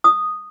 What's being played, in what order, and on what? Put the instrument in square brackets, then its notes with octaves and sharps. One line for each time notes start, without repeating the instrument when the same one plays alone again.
[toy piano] D#6